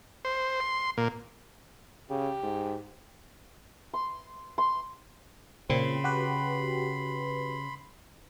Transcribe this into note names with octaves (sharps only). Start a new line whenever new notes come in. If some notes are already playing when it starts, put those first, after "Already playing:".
C5
C6
A#2
C#3 G4
G#2
C6
C6
A#2 C#3 C4 B5 C6
F#4 G4 B4